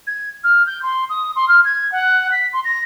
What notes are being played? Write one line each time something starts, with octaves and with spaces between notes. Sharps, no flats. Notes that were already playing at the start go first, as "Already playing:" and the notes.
G#6
F6
G6
C6
D#6
C6
F6
G#6
F#5
B6
C6
A#6